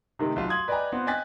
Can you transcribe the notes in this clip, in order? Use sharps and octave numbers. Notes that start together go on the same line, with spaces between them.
C3 D#3 A3 G4
B1 F4
C6 D#6 G#6 F#7
B4 D5 D#5 G5 G#5 A#5
B3 C4 F4
D#5 G5 G#5 F#6 A6 B6